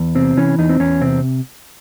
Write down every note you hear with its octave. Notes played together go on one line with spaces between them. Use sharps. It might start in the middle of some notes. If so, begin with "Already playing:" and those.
Already playing: E2
C3 C4
E3 C#4
E2 D#4
C4
E2 C#4
C3 C4